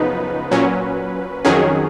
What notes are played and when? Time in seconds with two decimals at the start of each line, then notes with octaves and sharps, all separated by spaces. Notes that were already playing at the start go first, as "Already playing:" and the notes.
Already playing: F#2 C#3 F3 B3 D#4 B4
0.51 A#2 F#3 C#4
1.45 F2 D#3 F#3 C#4 G#4